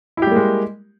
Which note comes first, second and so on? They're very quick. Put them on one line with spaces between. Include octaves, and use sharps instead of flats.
E4 G4 G3 A#3 G#3